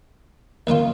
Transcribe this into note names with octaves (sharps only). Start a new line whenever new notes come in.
D#2 D#3 F#3 C#4 F4